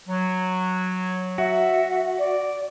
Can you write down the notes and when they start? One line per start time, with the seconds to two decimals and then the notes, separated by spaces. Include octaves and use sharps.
0.09 F#3
1.38 F#4 E5
2.19 D5